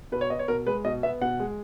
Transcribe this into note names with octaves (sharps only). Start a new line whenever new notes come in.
B2 B4
C#5
B3 D#5
C#5
B2 A#4
G#3 B4
B2 D#5
B3 E5
B2 F#5
G#3